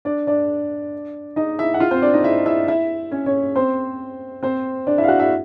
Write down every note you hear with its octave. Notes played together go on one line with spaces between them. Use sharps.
D4 D5
D4 D5
D#4 D#5
E4 E5
F#5
F4 F5
C4 C5
D4 D5
D#4 D#5
E4 E5
E4 E5
E4 E5
C#4 C#5
C#4 C#5
C4 C5
C4 C5
D4 D5
E4 E5
F5
F#4 F#5
E4 E5